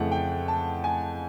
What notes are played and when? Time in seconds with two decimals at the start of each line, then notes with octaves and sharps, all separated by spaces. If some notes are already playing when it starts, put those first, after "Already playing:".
Already playing: F2 C#3 E3 A3 F#5
0.12 G5
0.48 A5
0.84 G#5